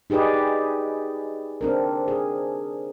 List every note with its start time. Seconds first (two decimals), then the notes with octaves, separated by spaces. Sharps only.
0.10 D#4 G4 G#4 B4 D5
1.61 C4 D4 A#4
2.08 G#4